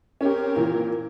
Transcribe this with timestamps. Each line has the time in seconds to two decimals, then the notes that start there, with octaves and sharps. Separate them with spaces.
0.21 C4 C#4 G4 A#4
0.56 A#2 E3